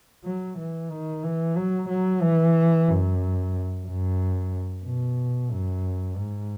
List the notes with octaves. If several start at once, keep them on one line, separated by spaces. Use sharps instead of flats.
F#3
E3
D#3
E3
F#3
F#3
E3
F#2
F#2
B2
F#2
G#2